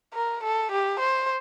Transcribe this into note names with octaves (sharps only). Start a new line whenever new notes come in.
A#4
A4
G4
C5